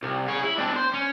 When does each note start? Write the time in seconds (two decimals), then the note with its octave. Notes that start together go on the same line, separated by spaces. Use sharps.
0.03 C2
0.28 G#4 C#5
0.43 E4
0.58 C4 D4
0.76 C5
0.94 C#4